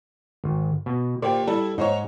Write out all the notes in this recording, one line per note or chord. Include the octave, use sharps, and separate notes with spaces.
G#1
B2
A#2 G4 C5 D5
G3 E4 A4
G#2 D#4 C5 C#5